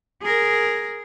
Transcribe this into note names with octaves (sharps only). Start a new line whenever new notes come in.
G#4 A#4